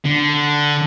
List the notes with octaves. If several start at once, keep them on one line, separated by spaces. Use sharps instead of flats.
D3